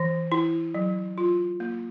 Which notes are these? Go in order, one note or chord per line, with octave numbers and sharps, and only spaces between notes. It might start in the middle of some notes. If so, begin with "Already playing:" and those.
Already playing: E3
E4
F#3
F4
A#3